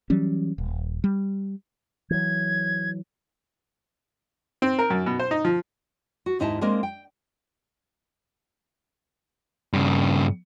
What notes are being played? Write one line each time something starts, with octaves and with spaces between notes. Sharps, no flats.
E3 F#3 G3 C#4
D#1
G3
E3 F#3 G#6
C4
A#4
F#2
B2
C5
D#4
F3
F#4
D#2 G#2 D#4 E4 A5
G#3 A#3 C4 D4 A#4 D#5
G5
G2 C#3